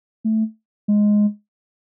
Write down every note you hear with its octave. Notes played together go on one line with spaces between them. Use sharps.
A3
G#3